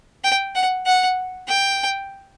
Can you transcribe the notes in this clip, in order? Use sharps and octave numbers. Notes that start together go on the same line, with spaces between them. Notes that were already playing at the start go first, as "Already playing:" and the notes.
G5
F#5
F#5
G5